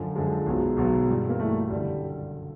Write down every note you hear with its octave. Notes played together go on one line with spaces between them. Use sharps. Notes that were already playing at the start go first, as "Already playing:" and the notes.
Already playing: F#2 D3 F3
F#2 D3 F3 G#3
B1 B2 F#3 G#3
B1 B2 F#3
G2 E3 G3
A#3
G2 E3 G3 A3
F#1 D3 G3